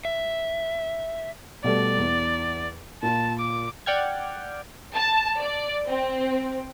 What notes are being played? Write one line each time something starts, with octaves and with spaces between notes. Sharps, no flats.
E5
B2 G3 A3 D5
E2
A#2 F4 A5
D6
D5 F#5 G5 F6 G#6
A5
D5
C4